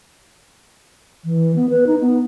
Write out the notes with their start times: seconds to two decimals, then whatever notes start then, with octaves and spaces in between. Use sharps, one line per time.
1.25 E3
1.56 B3
1.70 B4
1.87 D#4
2.01 B3